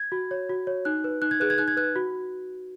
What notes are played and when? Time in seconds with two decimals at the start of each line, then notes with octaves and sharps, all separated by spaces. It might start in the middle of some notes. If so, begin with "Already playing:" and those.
Already playing: G#6
0.12 F#4
0.31 C#5
0.49 F#4
0.67 C#5
0.85 D#4 F#6
1.04 B4
1.22 D#4 F#6
1.31 G#6
1.40 G#4 B4 F#6
1.50 G#6
1.58 D#4 F#6
1.68 G#6
1.77 B4 F#6
1.96 F#4